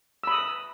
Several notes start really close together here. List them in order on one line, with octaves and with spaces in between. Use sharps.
E6 B5 D#6